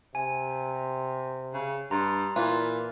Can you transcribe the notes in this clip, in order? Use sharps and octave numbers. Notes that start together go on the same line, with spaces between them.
C3 G#5
C#3
G2 A#5 C6
A#2 E3 F4